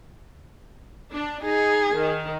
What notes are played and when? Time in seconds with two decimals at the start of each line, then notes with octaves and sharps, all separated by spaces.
1.13 D4
1.44 D#4 G#4
1.96 D#3